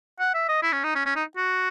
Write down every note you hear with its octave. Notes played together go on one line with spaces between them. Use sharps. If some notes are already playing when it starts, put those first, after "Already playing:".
F#5
E5
D#5
E4
C#4
D#4
C#4
C#4
D#4
F#4